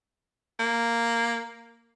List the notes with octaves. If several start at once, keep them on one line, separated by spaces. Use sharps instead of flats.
A#3